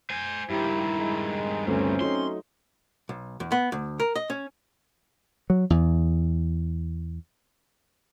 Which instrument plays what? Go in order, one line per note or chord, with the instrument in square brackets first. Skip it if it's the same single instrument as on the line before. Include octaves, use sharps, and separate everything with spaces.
[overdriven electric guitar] C5 G#5
[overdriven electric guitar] G2 D#3 [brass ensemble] F3 G4 [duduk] E4
[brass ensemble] G#3
[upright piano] G1 D2 A3 [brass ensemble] C4 [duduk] C#4
[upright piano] F#3 A3 D#4 [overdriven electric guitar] C6
[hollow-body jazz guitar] B1
E2
B3
D2
A#4
D#5
C#4
[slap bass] F#3
E2